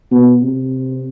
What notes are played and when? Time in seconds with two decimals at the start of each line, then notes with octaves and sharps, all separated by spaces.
0.11 B2
0.43 C3